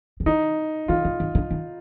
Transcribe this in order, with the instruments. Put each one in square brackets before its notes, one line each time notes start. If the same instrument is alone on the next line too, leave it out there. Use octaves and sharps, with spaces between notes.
[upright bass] D3
[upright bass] D#3 [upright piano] D#4
[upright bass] D#3 [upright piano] F4
[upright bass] D#3
D#3
D3
D#3